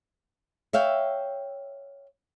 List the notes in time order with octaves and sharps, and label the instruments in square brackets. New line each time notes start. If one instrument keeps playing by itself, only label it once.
[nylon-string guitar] C#5 E5 F5 G5